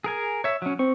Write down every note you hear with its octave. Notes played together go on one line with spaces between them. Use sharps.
G#4 A#4 G#5
C#5 E5
F#3 C#4
C4 C#6